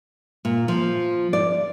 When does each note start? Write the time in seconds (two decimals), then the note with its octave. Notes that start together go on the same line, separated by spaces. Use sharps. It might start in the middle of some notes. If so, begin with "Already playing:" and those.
0.45 A#2
0.68 F3
1.33 D5